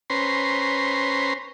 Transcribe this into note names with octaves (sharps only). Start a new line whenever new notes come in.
C#4 B4 C5 A#5 C6